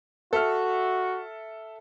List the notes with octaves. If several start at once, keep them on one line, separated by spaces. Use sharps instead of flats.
F#4 A4 E5 F6